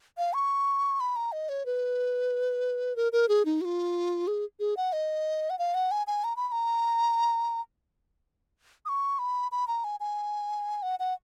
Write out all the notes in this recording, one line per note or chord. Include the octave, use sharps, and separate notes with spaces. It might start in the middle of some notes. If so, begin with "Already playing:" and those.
F5
C#6
B5
A#5
D#5
C#5
B4
A#4
A#4
G#4
D#4
F#4
F4
G#4
G#4
F#5
D#5
F#5
F5
F#5
G#5
G#5
A#5
B5
B5
A#5
D#6
C#6
B5
B5
A#5
G#5
G#5
F#5
F#5